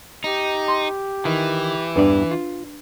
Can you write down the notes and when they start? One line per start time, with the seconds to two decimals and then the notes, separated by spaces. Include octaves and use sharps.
0.24 D#4 G4
0.68 C6
1.25 D#3 E3 E4
1.96 E2 G2 D4 B4 D5
2.31 F4